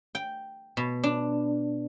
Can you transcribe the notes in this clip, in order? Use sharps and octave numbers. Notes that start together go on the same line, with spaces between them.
G5
B2
D4